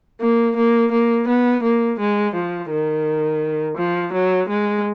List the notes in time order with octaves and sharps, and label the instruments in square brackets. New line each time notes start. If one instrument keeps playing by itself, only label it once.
[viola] A#3
A#3
A#3
B3
A#3
G#3
F3
D#3
F3
F#3
G#3